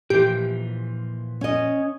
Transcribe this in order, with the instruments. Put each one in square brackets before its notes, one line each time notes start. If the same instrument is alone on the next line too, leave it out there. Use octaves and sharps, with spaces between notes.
[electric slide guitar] A#2 E3 F3 [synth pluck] G4
[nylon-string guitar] C#4 D#5